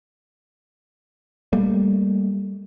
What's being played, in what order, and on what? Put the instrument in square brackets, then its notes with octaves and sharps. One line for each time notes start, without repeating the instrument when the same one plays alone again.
[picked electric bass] G3 A3 A#3